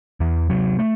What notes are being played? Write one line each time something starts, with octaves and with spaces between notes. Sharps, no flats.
E2 E3
C3 F#3
A3